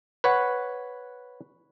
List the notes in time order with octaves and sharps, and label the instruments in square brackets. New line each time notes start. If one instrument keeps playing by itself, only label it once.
[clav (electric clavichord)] B4 C#5 F#5